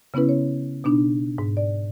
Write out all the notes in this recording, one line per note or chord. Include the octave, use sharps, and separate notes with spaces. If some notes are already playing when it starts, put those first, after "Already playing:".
C#3 B3 C#4 E4 B4
C#5
B2 B3 D4 D#4
G#2
D5